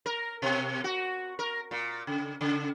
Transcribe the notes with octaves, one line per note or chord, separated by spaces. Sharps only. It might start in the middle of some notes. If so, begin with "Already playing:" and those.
A#4
B2
F#4
A#4
A#2
C#3
C#3